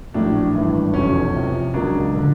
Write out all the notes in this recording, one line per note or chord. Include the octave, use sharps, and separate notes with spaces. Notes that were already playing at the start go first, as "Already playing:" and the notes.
A#1 A2 F#3 A3 D4
G#1 G2 E3 A3
F1 E2 B2 F#3 C#4
F2 C3 F3
C#2 C#3 F#3 A#3 D4
D3 F3